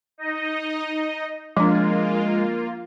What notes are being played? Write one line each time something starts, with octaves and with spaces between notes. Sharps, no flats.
D#4 D#5
F3 G#3 A#3 D4 F4